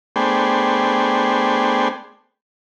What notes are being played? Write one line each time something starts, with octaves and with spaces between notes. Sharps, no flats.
A3 B3 D4 G#4 C5 G5